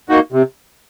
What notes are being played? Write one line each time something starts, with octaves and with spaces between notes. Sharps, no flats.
A#3 D#4 F#4
C3